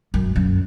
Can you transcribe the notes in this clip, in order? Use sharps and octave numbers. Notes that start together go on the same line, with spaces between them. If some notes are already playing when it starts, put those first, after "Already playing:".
F#2
F#2